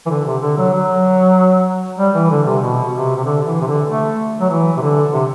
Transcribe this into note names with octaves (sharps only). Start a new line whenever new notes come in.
E3
D3
C3
D3
F#3
F#3
G3
E3
D3
C3
B2
C3
C3
D3
E3
C3
D3
A3
F#3
E3
C3
D3
C3